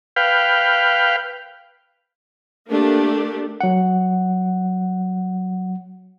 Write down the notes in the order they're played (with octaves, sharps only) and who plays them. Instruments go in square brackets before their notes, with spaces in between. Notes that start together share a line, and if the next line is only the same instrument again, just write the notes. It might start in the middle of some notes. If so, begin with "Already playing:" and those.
[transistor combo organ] B4 F5 G5
[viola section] A3 A#3 D4 G4
[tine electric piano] F#3 F#5